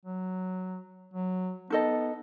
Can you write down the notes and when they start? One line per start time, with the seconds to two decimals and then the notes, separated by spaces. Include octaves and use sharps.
0.05 F#3
1.14 F#3
1.70 B3 D#4 A4 D#5